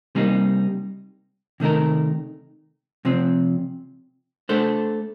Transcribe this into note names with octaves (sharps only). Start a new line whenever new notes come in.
C3 G3 A#3 D#4
C3 D#3 A3 D#4 A#4
C3 F3 C4
A3 D4 A4 C5